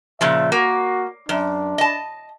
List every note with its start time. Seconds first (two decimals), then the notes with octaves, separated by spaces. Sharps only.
0.21 A#2 C#3 F3 E5
0.52 A#3 F#4
1.29 F#2 D4
1.78 D#5 A5